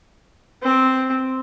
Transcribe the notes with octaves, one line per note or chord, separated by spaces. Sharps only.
C4